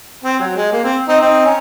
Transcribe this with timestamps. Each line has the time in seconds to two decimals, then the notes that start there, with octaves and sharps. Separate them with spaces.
0.24 C4
0.39 F#3
0.56 G#3
0.72 A#3
0.84 C4
1.08 C4 D#4
1.21 C4 D#4
1.45 C#4